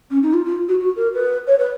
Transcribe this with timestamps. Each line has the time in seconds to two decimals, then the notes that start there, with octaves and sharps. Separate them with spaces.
0.10 C#4
0.22 D#4
0.33 F4
0.45 F4
0.68 F#4
0.79 F#4
0.96 A#4
1.13 B4
1.47 C#5
1.58 B4